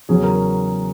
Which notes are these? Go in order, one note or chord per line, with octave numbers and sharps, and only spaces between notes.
E2 C#3 F#3 C#4 G#4
A#4